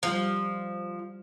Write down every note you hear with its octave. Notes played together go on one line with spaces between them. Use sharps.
F3 G3 F4 C5